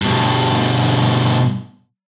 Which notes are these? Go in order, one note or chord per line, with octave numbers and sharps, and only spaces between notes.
G2 B2